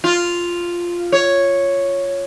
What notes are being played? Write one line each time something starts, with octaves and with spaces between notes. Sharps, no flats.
F4
C#5